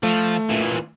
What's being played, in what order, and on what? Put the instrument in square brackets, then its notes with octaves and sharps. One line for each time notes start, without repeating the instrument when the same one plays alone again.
[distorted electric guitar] F3 [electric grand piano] A3
[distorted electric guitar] A#2 E3